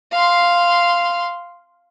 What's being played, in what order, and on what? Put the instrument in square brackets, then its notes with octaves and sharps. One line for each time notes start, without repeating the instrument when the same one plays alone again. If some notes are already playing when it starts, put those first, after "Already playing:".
[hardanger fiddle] F5 C6